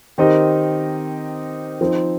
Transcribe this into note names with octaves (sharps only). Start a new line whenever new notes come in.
D#3 C4 D#4 G4 D#5
F3 C4 D#4